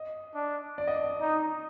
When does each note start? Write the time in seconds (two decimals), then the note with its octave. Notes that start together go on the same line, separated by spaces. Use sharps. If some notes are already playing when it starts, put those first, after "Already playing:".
Already playing: D#5
0.35 D4
0.78 D5
0.88 D#5
0.98 D5
1.21 D#4